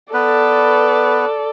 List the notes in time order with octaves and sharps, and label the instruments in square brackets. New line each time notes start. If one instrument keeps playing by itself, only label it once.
[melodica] B3 B4 [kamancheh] A4 D5